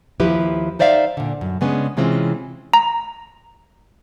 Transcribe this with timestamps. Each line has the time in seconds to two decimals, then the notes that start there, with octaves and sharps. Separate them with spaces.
0.20 D#2 F3 E4 G4 B4
0.79 D#4 C5 D5 E5 F5
1.17 A#2 D3
1.41 F#2
1.61 C#3 G#3 B3 C#4 D4
1.97 C3 E3 G#3 C4 C#4 F4
2.74 A#5